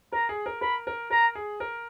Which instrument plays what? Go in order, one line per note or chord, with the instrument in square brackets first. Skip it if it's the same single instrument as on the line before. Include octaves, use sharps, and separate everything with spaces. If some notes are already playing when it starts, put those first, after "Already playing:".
[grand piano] A#4 [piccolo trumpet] A#5
[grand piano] G#4
A#4
[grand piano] A#4 [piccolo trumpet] B5
[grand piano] A#4
[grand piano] A#4 [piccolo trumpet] A#5
[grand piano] G#4
A#4